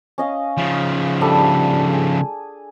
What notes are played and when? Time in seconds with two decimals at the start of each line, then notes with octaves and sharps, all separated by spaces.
0.18 C#4 D#5 F5
0.57 C#3 F3
1.21 G3 D4 A4
1.93 G#4